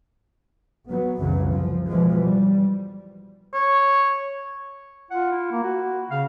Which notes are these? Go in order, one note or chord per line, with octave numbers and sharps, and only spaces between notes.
F#3 B3
C2 F#2 C#3 E3 F#3
F3
B2 E3 F3 G#3
G3
C#5
F4 F#5
E4
A#3
F#4
C#3 F5